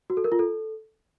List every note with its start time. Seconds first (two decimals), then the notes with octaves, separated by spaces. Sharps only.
0.10 F#4
0.17 A4
0.24 A#4
0.32 F4
0.39 A4